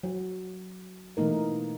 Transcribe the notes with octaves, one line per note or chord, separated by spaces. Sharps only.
F#3
B2 E3 A3 A#3 D#4 A#4